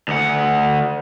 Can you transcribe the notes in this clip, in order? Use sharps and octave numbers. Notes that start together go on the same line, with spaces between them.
D2 F#5